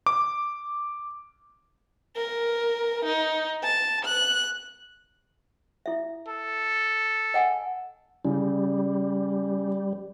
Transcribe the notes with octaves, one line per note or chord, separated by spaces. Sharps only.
D6
A#4
D#4
A5
F#6
E4 E5
A4
D#5 F#5 G#5
C#3 G3